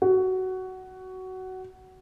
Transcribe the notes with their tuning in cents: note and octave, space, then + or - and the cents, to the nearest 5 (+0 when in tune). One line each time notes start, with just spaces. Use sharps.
F#4 +15